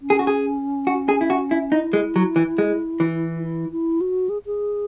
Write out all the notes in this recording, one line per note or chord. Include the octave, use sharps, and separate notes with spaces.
C#4
G#4
F#4
G#4
F#4
G#4
E4
F#4
E4
D#4 E4
G#3
F#3
E3
G#3
E3
E4
E4
F#4
G#4
G#4